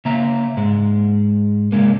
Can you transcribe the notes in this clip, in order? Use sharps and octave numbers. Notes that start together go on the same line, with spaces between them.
C#3 A#3 E5 A#5
G#2 G#3
C#3 G#3 A#3